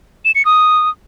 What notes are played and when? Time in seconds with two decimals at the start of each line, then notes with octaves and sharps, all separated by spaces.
0.25 E7
0.35 C#7
0.45 D#6